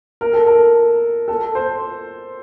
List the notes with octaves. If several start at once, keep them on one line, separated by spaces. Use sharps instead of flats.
A#4
A4
A#4
A4
C5